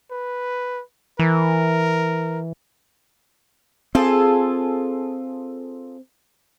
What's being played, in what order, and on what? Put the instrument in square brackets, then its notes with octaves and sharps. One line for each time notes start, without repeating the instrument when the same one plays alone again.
[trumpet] B4
[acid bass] E3 [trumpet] A#4
[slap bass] C4 [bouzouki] F4 G#4 A4